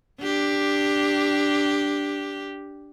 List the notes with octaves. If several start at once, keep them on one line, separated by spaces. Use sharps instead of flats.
D4 G4